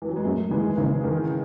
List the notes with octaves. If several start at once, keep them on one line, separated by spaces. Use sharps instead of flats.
E3
F#3
G#3
F#2 F#3 A3
G#1 E3 G#3
G#1 C#3 E3
D#3 E3